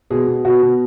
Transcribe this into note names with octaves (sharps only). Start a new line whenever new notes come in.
B2 G#4
B2
B2 F#4
B2